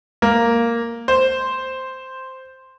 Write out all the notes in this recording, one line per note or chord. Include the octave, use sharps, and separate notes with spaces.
A#3
C5